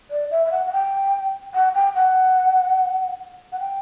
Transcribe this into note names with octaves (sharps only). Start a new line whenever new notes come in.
D5
E5
E5
F#5
F#5
G5
F#5
G5
F#5
F#5
G5